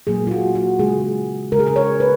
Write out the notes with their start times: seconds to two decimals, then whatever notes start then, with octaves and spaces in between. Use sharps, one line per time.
0.07 A#2 F#3 A#3 G#4
0.27 F4
0.31 F#4
0.55 F#4
0.79 C#3 G#3 G#4
1.52 C#3 G#3 A#4
1.59 G#4
1.67 A#4
1.76 C#5
2.00 B4